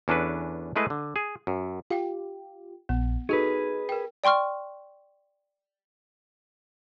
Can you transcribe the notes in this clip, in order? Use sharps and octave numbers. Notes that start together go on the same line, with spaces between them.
E2 C#4 D4 A4 B4
G#3 A3 E4 G#4 B4 D#5
D3
G#4
F#2
F4 G4 F5 G5
A#1 B3
D#4 F#4 G#4 A4 B4
A#4 G5
D5 G5 C6 C#6 F6